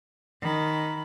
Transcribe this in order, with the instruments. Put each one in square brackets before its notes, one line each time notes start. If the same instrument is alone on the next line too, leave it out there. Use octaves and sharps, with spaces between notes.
[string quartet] D#3 B5